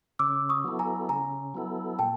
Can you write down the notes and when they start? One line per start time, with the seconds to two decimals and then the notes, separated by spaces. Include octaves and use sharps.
0.19 C#3 D6 E6
0.49 C#6 D#6
0.64 F#3 B3 E4 A4
0.79 G#5 A#5
1.09 C#3 G#5 A#5
1.54 F#3 B3 E4 A4
1.99 A#2 G5 A5